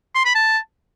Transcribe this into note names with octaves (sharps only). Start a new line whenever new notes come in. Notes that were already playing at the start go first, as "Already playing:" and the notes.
C6
B5
A5